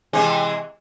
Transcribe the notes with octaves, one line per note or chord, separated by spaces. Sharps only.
C3 E3 G#3